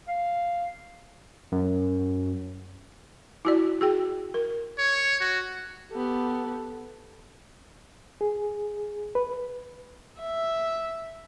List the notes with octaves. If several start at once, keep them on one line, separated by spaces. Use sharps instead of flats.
F5
F#2
E4 F#4 D5
F#4 G#4 G5
A#4
C#5
F#4
B3 G4 A4
G#4
B4
E5